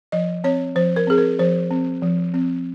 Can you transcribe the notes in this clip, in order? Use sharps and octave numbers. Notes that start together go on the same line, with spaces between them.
F3 D#5
C4 C#5
F3 C5
A#4
C4 G#4
A#4
F3 C5
C4
F3
C4